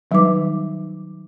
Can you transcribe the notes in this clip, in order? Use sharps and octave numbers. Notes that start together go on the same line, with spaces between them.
D#3 F#3 G3 D#4 B4 D6